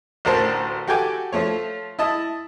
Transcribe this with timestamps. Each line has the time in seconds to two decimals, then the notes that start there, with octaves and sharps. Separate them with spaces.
0.25 A1 D2 A#4 C5 A5
0.87 F#4 G4 A4 G5 G#5 D6
1.33 F3 A3 C#5
1.99 E4 D#5 A5